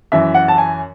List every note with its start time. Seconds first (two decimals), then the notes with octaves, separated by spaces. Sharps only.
0.12 F#2 E3 E5
0.34 F#5
0.48 A5
0.58 G#5